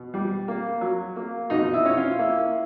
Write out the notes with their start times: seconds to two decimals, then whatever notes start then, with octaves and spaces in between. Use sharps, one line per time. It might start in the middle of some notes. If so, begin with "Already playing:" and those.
Already playing: B2
0.14 G3
0.48 A#3
0.81 F#3
1.16 A#3
1.50 B2 D#4
1.73 E4
1.85 C#4
1.97 F4
2.19 A#3 E4